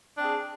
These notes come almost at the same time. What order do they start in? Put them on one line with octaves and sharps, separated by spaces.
D4 C4 G#4